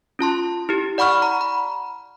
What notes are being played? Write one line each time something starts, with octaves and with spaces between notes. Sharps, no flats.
C#4 F4 A5 C6
E4 G4
D5 F#5 B5 C#6 F6
A#5
B5